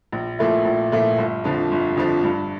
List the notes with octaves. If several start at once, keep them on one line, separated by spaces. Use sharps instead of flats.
A#1
A#2 F3 A3 E4
A#1
A#2 F3 A3 E4
G1
F2 D3 F3
G1
F2 D3 F3
G2